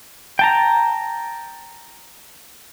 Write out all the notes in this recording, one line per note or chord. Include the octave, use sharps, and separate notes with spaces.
G5 A5 A#5